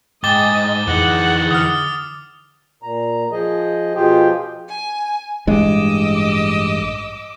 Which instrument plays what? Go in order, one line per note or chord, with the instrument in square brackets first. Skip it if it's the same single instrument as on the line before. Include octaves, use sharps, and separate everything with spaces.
[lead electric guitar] G#2 [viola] D#5 [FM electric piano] G5 G#5 [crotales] D6 A6 G7
[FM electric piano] F2 A#6 [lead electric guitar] E3 D#4 [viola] G#4 F#5
[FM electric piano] D3 [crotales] D#6 F6
[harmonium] A#2 A#5
F3 G#4 D#5
B2 F3 F4 G4 G#4 G5
[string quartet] G#5
[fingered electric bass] A1 G2 G#3 [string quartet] D#5 D6 E6